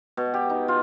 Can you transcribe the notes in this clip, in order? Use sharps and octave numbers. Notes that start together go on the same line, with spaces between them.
B2
G4
D#4
F4